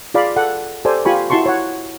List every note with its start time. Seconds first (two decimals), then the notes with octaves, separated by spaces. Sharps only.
0.14 F4 G#4 D5 F5 B5
0.36 A4 F#5
0.85 G4 A4 C5 D5 G#5
1.05 F4 G4 G#5 B5 C#6
1.30 E4 F#4 A5 C6 C#6
1.46 C#5 F#5